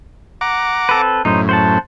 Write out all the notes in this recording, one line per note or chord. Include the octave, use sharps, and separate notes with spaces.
F#5 A#5 D6
C4 A4 B4
F#2 A2 D#4 C5
C5 F#5 A5